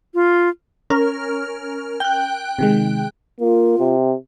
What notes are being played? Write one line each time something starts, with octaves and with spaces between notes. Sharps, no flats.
F4
C#4 A#4 F6
G5 F#6
C3 D#3 G#3
A#3 F4
C3